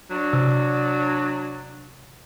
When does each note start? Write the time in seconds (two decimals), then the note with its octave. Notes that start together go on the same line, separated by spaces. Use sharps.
0.11 F#3 D4
0.33 C3